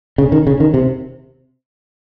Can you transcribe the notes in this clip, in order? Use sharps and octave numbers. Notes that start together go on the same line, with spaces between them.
C#3
D#3
C#3
D#3
C3